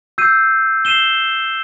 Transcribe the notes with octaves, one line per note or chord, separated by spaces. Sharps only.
E6 G6 C7 D#7
C7 D#7 E7 G7